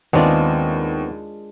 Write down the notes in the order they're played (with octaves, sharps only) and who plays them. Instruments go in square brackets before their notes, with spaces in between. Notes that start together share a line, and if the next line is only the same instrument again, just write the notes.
[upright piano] D#2 [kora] G#3 D4 F4 [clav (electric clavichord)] B3 C4